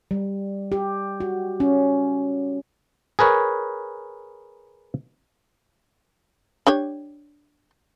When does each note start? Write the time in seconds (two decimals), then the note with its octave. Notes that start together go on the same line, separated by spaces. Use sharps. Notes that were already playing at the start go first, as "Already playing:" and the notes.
0.11 G3
0.72 G4
1.20 F#4
1.60 C#4
3.19 G#4 A#4 B4 C#5
6.67 D4 G4 C#5